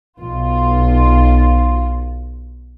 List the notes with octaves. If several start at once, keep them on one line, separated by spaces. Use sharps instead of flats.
B1 F4